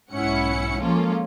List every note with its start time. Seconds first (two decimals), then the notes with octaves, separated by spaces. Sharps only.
0.11 B1 G#2 C#4 E4 F#5 C#7
0.81 F3 G#3 A#3 C#4 F4 A4